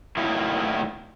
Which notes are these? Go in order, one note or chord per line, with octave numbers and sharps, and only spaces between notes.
A2 D#3 F#3 A#3 E4